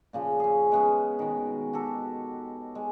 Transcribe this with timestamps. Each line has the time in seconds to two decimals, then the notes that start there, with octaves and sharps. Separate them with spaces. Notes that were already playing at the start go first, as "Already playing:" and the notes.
0.13 A#2 C#3 F3
0.39 C#4 G#4
0.72 G#3 B3 C#4
1.19 B2 D#3
1.73 F#4 G4 A4
2.75 G#3